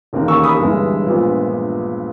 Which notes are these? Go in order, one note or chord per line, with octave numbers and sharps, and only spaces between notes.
E1 D#2 D#3 A#3
C#6 E6
B5 D#6
G1 G2 E3 G#3
A#1 A#2 G#3 B3